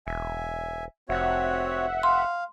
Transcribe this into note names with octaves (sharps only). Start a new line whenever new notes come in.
E1 E5 G#5
F1 C4 F#4 C#5 E5 F#5
F5 C6